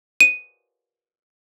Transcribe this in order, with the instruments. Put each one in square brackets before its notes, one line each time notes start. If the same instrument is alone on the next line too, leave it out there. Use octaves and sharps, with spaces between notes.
[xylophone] D#7